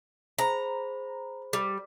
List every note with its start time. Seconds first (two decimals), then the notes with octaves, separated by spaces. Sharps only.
0.39 G#4 C5 A#5 B5
1.53 G3